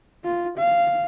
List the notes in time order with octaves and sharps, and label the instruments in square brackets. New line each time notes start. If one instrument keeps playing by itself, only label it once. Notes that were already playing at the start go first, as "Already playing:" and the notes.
[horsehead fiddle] F4
F5